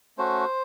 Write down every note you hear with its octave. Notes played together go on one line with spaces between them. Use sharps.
A3 C#4 F#4 C5